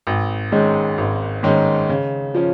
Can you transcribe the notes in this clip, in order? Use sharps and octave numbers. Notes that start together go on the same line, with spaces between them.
G#1
G#2 D#3 G#3 C#4
G#1
G#2 D#3 G#3 C#4
C#3
F3 C#4